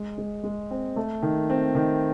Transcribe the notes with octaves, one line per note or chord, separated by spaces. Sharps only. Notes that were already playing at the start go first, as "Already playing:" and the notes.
Already playing: G#3
G#3
G#3
C4
A3
D#3
C4
D#3